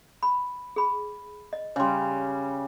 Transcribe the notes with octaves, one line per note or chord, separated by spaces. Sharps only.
B5
G#4 B5
D#5
C#3 G3 C#5 C6